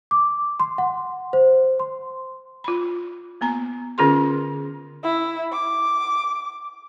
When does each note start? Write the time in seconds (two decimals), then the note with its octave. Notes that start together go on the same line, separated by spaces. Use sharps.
0.11 D6
0.60 C6
0.78 F#5
1.33 C5
1.80 C6
2.64 F4 B5
3.41 A#3 B3 A#5
3.98 D3 C#4 F4 G#4 A#4 C6
5.03 E4
5.52 D6